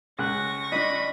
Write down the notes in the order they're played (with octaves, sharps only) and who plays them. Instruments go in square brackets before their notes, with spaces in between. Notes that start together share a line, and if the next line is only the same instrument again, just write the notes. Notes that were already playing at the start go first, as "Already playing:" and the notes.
[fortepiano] C#2 F#6 [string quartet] C#6 A#6
[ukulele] D4 D#5 [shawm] B5